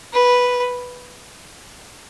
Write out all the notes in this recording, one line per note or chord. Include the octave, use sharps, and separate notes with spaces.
B4